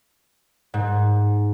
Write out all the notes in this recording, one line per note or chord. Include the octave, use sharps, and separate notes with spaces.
G#2